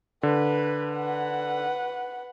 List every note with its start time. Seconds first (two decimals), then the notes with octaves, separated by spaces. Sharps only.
0.23 D3 B4
0.92 B4 F#5